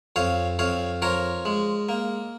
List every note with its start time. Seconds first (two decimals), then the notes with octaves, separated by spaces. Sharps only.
0.16 F2 C#5 F5
0.59 F2 C#5 F5
1.02 F3 A#4 C#5
1.45 G#3
1.89 A#3